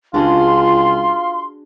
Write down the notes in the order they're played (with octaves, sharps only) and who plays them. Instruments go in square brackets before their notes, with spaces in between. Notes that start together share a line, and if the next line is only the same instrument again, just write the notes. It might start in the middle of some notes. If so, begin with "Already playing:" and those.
[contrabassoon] C#2 [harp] D4 F#4 G#4 [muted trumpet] F4 [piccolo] C6